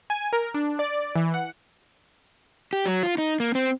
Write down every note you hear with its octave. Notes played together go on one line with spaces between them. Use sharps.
G#5
A#4
D4
D5
E3
F#5
G4
F#3
F4
D#4
A#3
C4